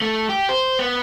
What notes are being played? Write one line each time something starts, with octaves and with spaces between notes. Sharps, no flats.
A3
G4
C5
B3